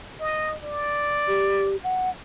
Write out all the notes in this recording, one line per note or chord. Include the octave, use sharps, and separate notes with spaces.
D#5
D5
G4
F#5